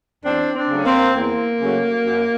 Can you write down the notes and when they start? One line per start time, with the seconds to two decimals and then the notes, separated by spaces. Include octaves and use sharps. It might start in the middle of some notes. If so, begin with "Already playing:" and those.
0.24 E2 C4 D4
0.56 C4 D4
0.70 C#3 F#3 A3
0.78 C#4
0.85 A#3 C4
1.15 E2 A#3
1.61 C#3 F#3 A3
2.06 F#2